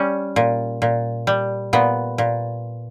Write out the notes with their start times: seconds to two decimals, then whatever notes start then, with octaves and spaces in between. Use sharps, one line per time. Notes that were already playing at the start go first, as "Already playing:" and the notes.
Already playing: G3 C#4
0.36 A#2
0.82 A#2
1.27 G3
1.73 A#2 B3
2.18 A#2